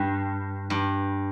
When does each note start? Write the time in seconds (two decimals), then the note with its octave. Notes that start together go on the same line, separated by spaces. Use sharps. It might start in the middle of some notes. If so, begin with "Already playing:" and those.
Already playing: G2
0.70 G2